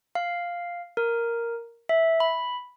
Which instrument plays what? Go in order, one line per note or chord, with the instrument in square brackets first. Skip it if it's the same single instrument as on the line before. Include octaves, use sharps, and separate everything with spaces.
[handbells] F5
A#4
E5
B5